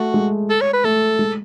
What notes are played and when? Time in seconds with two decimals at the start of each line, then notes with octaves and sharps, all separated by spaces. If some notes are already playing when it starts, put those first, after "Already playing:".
Already playing: A3 F#4
0.14 G#3
0.50 A4
0.61 C#5
0.73 B4
0.84 A3 A4
1.19 G#3